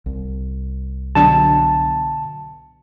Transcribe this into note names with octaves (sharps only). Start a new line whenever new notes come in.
C2
B2 D3 F#3 A5